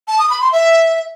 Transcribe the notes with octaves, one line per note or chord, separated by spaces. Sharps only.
A5
D#6
B5
C6
E5